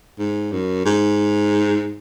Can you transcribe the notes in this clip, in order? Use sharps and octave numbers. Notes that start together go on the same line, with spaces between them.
G#2
F#2
G#2